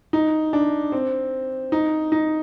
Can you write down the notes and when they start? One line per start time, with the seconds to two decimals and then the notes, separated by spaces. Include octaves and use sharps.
0.13 D#4
0.53 D4
0.92 C4
1.72 D#4
2.12 D#4